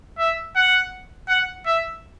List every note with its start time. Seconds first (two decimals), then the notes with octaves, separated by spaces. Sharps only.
0.18 E5
0.56 F#5
1.28 F#5
1.66 E5